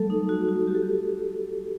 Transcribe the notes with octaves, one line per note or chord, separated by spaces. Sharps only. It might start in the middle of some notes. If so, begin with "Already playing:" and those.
Already playing: F#3 G3 A3 A4
D#4
F#4
F#4
G4
A4
G4